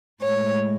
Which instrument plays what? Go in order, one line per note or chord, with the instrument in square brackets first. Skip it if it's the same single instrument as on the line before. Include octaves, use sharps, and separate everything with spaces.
[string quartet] A2 G#3 C#5